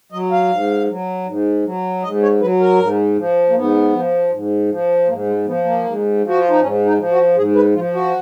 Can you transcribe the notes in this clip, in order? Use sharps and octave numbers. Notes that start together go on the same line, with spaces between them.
F#3 D#5
F5
G#2
F#3
G#2
F#3
G#2 D#5
C#5
F#3 B4
A#4
G#2
F3
A#3
G#2 B3
F3
G#2
F3
G#2 A#3
G#3
F3 B3
A#3
G#2
F3 F#4
F4
D#4
G#2 C#4
D#4
F3
F#4
G#2 G#4
B4
F3 F4
F#4